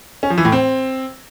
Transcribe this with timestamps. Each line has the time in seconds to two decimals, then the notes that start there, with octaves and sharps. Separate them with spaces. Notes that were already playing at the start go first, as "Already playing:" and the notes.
0.23 C#4
0.30 F3
0.38 E3
0.45 A2
0.52 C4